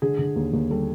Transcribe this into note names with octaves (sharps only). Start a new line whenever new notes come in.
D3 G#4
D3
D#2
D#2
G3 A4